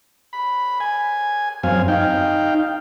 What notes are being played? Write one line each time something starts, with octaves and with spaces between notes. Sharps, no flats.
B5
G#5
F#2 C4 F5 G#5
D#4 F5 G5